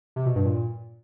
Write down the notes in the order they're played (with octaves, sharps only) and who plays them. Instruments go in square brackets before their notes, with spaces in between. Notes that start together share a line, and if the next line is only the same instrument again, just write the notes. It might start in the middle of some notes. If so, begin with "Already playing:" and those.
[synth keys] C3
B2
G2
A#2